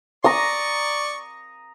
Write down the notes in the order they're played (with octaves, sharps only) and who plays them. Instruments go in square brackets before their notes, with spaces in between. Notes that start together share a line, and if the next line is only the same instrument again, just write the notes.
[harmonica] D5 C#6 [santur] A#5 D#6